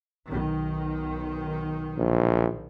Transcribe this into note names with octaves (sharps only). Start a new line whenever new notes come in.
B1 D#3
A#1